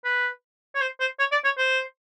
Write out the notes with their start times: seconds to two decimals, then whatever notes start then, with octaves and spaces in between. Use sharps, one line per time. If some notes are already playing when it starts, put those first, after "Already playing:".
0.04 B4
0.75 C#5
0.81 C5
1.00 C5
1.19 C#5
1.32 D5
1.45 C#5
1.58 C5